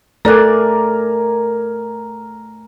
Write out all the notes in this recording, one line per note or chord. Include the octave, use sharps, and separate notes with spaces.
A3 A4 A#4 D5 G#5 F#6